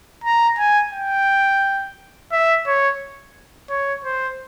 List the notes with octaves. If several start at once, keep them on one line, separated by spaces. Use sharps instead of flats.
A#5
G#5
G5
E5
C#5
C#5
C5